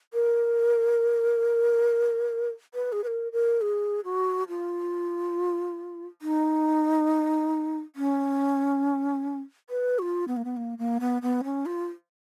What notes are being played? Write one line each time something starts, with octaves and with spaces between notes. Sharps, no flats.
A#4
B4
G#4
B4
A#4
A#4
G#4
F#4
F4
D#4
C#4
B4
F#4
F4
B3
A#3
B3
A#3
A#3
B3
B3
C#4
F4